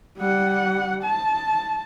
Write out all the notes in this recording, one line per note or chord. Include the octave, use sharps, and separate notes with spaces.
G3 F#5
A5